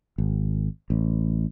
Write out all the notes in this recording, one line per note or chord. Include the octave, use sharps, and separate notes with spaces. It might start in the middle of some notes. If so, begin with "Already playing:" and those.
G#1
A1